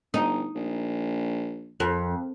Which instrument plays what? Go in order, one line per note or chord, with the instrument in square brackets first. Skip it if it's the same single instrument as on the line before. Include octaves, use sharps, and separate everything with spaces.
[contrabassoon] G1 [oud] D#4
[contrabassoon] A#1
[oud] F2